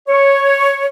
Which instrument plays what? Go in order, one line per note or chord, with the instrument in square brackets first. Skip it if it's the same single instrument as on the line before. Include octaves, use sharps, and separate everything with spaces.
[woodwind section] C#5